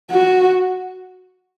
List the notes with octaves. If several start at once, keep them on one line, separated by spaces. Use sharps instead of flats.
F#4